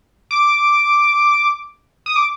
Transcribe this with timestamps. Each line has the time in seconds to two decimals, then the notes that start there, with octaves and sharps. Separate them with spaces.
0.31 D6
2.06 D#6
2.16 D6